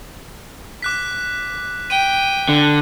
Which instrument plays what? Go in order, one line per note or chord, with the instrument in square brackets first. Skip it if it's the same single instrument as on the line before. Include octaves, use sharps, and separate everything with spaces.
[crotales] D6 F#6 B6
[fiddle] G5 [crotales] D#7
[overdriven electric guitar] D3